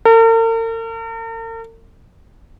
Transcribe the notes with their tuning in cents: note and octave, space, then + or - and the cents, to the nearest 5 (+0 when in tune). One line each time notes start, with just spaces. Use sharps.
A#4 -45